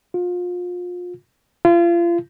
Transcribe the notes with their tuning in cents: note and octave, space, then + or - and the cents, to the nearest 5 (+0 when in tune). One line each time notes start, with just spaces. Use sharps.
F4 +30
F4 -35